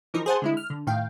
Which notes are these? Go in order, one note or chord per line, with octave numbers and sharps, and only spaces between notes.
E3 F3 D#4 A#4
G#4 C5 F#5 A5
D3 G#3 E4
F6
D3
A2 D#3 F5 G5